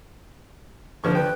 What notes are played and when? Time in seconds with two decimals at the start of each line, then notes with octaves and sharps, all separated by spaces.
1.04 D3 F3 B4 C#6
1.15 B4 G5